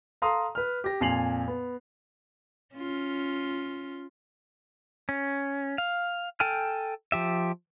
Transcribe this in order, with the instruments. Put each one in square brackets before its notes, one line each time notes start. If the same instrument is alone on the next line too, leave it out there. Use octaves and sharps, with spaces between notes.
[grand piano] A4 F5 A#5 C6 D#6
B4 F6
G4 A#6
F2 A#2 G#5 C7 F7 F#7
B3
[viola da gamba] C#4 F4
[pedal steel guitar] C#4
F5
A4 G5 G#5 F6
F3 G4 E5